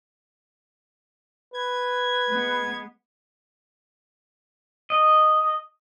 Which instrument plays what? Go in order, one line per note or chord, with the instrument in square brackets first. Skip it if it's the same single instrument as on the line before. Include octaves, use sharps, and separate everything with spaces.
[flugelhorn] B4 [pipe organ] G#6
[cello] G#3 B3
[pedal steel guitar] D#5